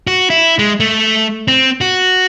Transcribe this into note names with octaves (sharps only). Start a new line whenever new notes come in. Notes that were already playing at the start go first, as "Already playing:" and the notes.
F#4
E4
G#3
A3
C4
F#4